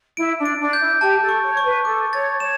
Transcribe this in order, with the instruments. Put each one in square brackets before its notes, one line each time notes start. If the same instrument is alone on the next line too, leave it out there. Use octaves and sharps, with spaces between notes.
[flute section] E4 [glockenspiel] D7
[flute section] D4
[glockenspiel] D7
[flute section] D4
[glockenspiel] G6
[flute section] E4
[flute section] G4 [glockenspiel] A5
[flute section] A4
[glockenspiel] C#6
[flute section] C#5
[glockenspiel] C#6
[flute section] B4
[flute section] A4 [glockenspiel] D6
[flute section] C#5 [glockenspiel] A6
[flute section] C#5 [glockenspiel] E7